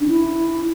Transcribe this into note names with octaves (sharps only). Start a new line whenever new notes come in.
D4
E4